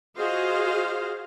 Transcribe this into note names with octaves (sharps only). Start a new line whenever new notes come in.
F4 F#4 G#4 C5 D#5 F5